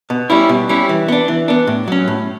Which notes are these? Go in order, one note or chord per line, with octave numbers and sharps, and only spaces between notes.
B2
G3 C#4 E4
B2
G3 C#4 E4
E3
B3 D4
E3
B3 D4
A2
F#3 C#4
A2